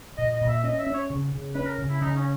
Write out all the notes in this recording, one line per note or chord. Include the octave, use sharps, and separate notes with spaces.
A#2 D#5
D#5
A#2
E5
C#4 D#5
E5
C#4
C#5
C#3
C#3
C#4 B4
A#4
C#3
E4
C#3 D#4
C#4